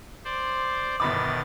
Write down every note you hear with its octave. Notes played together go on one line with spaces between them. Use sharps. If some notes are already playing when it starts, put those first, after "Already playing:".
C5 D5
G1 B2 D#3 B5 D6 A6